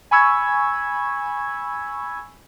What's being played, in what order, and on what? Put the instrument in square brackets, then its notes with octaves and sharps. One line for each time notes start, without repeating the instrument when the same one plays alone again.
[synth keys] G#5 B5 C#6 E6 G#6